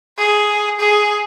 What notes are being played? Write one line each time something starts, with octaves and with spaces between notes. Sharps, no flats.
G#4
G#4